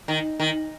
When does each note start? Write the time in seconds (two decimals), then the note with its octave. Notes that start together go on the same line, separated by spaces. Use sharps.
0.08 D#3
0.40 D#3